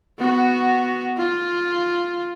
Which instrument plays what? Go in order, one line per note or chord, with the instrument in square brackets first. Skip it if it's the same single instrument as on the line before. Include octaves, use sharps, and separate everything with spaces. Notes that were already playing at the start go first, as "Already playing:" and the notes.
[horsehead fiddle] B3 F#4
F4